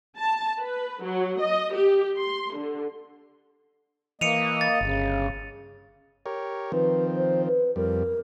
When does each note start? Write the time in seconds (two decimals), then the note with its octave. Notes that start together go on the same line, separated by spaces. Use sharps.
0.17 A5
0.59 B4
1.03 F#3
1.40 D#5
1.74 G4
2.18 C6
2.57 D3
4.21 E3 A#3 D#5 C#7 D#7 F7
4.61 A6
4.81 G1 C#3
6.26 G4 A#4 C#5
6.72 D#3 F3 C4 B4
7.16 C5
7.47 B4
7.76 F2 G3 A#4